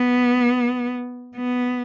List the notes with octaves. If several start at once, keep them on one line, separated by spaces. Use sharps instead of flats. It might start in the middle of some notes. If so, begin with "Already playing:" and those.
Already playing: B3
B3